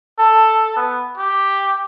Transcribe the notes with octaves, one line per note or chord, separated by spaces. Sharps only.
A4
B3
G4